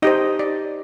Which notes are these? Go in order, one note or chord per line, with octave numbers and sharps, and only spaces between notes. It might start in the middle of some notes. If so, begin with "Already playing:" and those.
D#4 G4 C5 D#5
D5